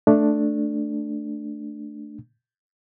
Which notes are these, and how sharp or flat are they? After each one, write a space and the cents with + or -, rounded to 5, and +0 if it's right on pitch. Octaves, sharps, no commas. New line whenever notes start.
A3 +0 D4 +5